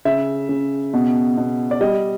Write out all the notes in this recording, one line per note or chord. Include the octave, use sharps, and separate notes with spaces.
C#3 E5
C#3
B2
B2
D5
G3 D#5